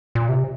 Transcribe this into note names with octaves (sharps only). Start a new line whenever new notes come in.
A#2
C3